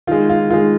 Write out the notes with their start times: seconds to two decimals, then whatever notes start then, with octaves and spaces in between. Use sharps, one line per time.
0.07 D#3 G#3 F4
0.29 F4
0.50 D#3 G#3 F4